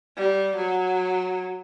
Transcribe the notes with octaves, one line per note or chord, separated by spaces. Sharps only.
G3
F#3